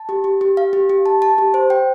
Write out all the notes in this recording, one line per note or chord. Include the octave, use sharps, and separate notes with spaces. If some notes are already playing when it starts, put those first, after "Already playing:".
Already playing: A5
G4
G4
G4
F5
G4
G4
A5
A5
G4
C5
G5